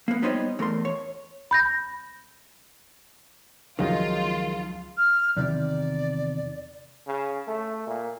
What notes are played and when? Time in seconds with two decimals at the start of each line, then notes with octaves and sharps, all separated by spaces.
0.08 A#3 B3
0.22 G3 B3 D#4 C5 C#5 D#5
0.59 E2 A3 A#4 C6
0.85 C#5
1.51 B5 G6 A#6
3.79 C#2 D#3 F3 F#3 G#3 D#4 F4
4.97 F6
5.37 E2 C3 D#3 D5
7.07 C#3
7.48 A3
7.87 A#2